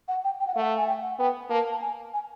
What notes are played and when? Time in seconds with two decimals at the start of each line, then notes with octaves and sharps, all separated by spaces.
0.08 F#5
0.24 G5
0.40 G5
0.47 F#5
0.54 A3 F5
0.62 F#5
0.77 G#5
0.87 G5
1.02 F#5
1.19 B3 G5
1.50 A#3 A5
1.71 A5
1.82 G#5
2.14 G#5